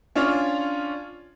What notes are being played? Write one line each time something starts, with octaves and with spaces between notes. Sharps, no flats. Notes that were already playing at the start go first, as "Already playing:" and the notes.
C#4 D4 F4 C#5